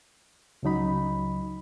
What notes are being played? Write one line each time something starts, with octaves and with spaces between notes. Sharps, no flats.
C#2 C#3 F#3 D#4 B5